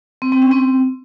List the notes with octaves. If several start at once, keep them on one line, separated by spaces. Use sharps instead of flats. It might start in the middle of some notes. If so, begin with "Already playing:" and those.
C4
C4
C#4
C4